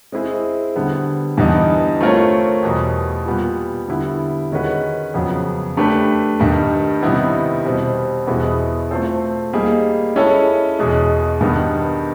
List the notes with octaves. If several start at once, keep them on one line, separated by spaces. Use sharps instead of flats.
G#3 C4 E4 G#4
D3 G3 B3
G2 E3 G3 B3 D#4
A3 C4 F4 A#4 C#5
E2 B2 G3
A#2 G3 B3
D3 G3 B3 E4
D#3 G#3 C#4 F#4 B4
F2 C#3 F#3 B3
A3 D4 G4 B4
G2 D#3 G3
C3 D#3 G3 B3 E4
B2 G3 C4
E2 B2 G#3 B3 E4
A3 C4 F4 A4 C5
G3 A#3 D#4 G#4
G#3 C#4 E4 A4 C#5
E2 B2 G#3
G2 D#3 G3 B3